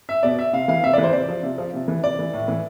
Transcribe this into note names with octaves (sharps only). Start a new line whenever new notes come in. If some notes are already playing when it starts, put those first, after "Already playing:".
E5
B2 D5
E5
C3 F5
E3 F5
C3 E5
E3 D5
C5
C3 D5
F3
C3
F3
C3
E3
C3 D5
E3
A2
E3